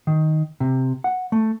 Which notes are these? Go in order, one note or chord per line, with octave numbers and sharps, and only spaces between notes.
D#3
C3
F#5
A3